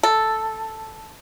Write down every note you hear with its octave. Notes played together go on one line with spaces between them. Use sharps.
A4